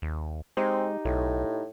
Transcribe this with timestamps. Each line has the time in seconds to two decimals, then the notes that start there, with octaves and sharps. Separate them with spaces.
0.02 D#2
0.57 G#3 C4 D#4 G4
1.05 B1 A2